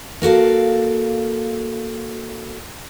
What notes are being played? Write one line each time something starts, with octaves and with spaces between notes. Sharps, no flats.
A#3 F#4 A4 F5